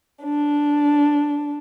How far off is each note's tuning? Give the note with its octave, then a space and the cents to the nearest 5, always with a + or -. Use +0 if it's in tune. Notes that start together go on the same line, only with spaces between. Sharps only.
D4 -5